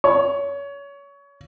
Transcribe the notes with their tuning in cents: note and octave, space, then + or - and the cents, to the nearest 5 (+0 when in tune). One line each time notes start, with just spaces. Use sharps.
C#5 +25